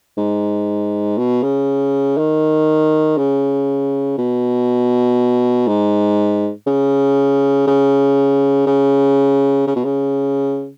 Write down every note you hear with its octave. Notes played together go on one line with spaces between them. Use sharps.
G#2
B2
C#3
D#3
C#3
B2
G#2
C#3
C#3
C#3
C#3
B2
C#3